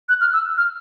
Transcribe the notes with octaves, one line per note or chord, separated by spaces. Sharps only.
F#6
F6
E6
F6